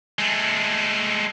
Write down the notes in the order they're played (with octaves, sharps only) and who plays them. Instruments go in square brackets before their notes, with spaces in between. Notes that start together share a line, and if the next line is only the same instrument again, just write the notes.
[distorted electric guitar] G#3 A3